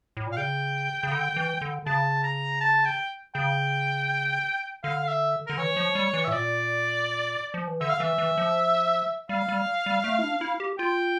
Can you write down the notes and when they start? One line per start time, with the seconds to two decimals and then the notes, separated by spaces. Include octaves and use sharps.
0.17 A2
0.27 A#2
0.32 F5
0.37 C#3 G5
1.03 C#3
1.11 D3
1.36 E3
1.61 D3
1.86 C#3 A5
2.23 A#5
2.61 A5
2.86 G5
3.35 C#3 G5
4.83 D3 F5
5.04 F5
5.08 E5
5.47 D3 A#4
5.58 E3 C#5
5.77 F3
5.95 G3
6.14 E3
6.25 E5
6.28 A2
6.32 A#2 D5
7.54 F3
7.68 E3
7.81 D3 E5
7.90 F5
7.99 E3 E5
8.18 E3
8.38 F3
9.29 G3 F5
9.49 G3
9.86 G3
10.04 A3
10.19 E4
10.23 D4
10.41 E4
10.60 G4
10.79 F4 G5